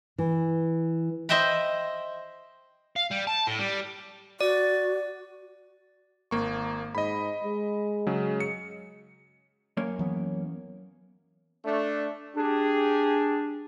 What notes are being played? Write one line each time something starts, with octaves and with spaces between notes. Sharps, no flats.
E3
C5 D#5 E5 G5 B5
F5
G3
A5
A2
G3
F#4 D5
G#1 A#3 C#6
G#2 D#5 B5
G#3
C#3 F#3
C#7
F#2 A#3 C#5
E3 F#3 B3
A3 D4
D4 G4 G#4